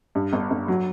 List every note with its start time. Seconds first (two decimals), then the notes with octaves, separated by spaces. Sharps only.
0.15 G2
0.33 G1
0.50 G1
0.68 F#3